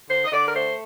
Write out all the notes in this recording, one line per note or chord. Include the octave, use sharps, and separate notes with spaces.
D3 C5
D#5
D3 D5
A#4
A3 C5